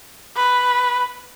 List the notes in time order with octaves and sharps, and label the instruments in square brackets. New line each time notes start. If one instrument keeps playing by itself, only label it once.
[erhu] B4